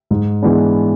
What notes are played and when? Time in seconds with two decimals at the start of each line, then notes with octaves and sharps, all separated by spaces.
0.11 G#2
0.42 E3 G#3 B3 D4